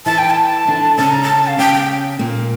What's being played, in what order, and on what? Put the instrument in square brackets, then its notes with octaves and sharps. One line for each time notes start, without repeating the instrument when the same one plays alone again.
[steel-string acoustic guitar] E3 E4 [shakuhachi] A5
[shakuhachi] G5
A5
[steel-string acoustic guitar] D3 D4
[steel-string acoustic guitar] C#3 C#4 [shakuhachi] A5
[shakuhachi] A#5
A5
F5
[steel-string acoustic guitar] C#3 C#4 [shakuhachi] G5
[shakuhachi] G5
[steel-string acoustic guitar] A#2 A#3